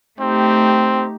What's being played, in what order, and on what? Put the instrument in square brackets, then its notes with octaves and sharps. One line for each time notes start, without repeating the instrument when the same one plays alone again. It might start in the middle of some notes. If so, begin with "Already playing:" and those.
[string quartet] A3 D#4 G4 [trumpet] C4